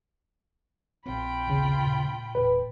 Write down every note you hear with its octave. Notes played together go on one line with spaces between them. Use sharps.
A#1 C4 F4 G5 B5
D#2 C#3
A#2
E1 A#2 B4